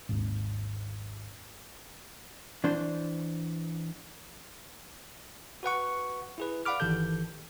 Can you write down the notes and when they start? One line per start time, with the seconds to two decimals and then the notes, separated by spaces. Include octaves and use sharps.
0.09 G#1 D#2
2.64 E3 D4 C5
5.63 F#4 B4 F#5 C#6
6.38 E4 G#4 B4
6.65 D5 F5 F#5 B5 D6 F6
6.80 G1 D#3 E3 G4 A4 G6